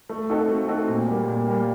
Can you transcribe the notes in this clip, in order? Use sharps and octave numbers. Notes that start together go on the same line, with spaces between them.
A3
C4 D#4 F#4 A4
A3
C4 D#4 F#4 A4
A#2
G3 A#3
A#2
G3 A#3